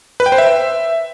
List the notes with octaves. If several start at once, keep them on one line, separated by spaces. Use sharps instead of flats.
B4
G5
C5
E5